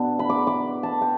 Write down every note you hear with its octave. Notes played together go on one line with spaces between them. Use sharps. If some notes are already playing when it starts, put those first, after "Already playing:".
Already playing: B2 B3 D4
B5
D6
D6
A5
G5